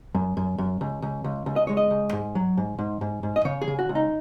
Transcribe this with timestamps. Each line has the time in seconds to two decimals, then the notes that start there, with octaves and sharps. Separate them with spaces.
0.15 F#2
0.37 F#2
0.58 F#2
0.81 C#2
1.02 C#2
1.24 C#2
1.46 C#2
1.56 D#5
1.67 G#3 C#5
1.77 D#5
1.91 C#2
2.13 G#2
2.35 F#3
2.57 G#2
2.79 G#2
3.01 G#2
3.23 G#2
3.36 D#5
3.45 C#3 C#5
3.62 G#4
3.68 C#3
3.79 F#4
3.89 C#2
3.95 D#4